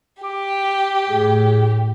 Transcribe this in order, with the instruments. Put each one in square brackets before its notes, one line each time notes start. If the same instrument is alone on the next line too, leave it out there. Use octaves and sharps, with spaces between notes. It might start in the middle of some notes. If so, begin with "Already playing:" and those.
[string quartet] G4 [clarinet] D6
[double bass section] A2 [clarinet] G#4